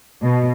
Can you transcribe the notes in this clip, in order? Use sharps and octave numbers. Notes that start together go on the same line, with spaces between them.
B2